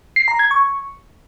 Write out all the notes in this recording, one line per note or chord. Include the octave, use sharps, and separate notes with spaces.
C7
A#5
G#6
C#6